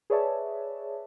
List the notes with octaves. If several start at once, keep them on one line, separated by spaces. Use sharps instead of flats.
G#4 B4 C#5 D5 E5 A5